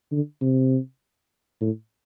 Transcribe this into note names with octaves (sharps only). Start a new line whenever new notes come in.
D3
C3
A2